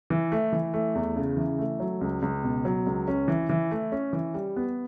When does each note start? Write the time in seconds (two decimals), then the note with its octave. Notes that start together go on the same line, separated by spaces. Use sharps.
0.10 E3
0.32 A3
0.52 E3
0.74 A3
0.95 E2
1.16 C#3
1.37 E3
1.59 A3
1.80 F#3
2.01 C#2
2.22 C#2
2.44 B2
2.65 F#3
2.87 C#2
3.08 C#4
3.28 E3
3.49 E3
3.71 A3
3.92 C#4
4.13 E3
4.34 G3
4.56 B3